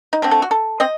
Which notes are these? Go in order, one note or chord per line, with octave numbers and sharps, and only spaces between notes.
D#4
D3 A3 C4
A4
F#4
A4
C4 D#5